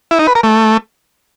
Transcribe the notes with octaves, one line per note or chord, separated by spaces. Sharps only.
E4
D#4
B4
A#4
A3